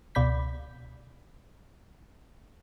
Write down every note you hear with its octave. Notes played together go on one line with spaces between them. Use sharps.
C#2 B2 D5 B5 G6 B6